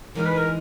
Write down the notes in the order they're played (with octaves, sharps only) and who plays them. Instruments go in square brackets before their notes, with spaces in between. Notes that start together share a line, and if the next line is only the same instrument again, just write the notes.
[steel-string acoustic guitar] E3 G#3 D#4 [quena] A#4
[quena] B4
A#4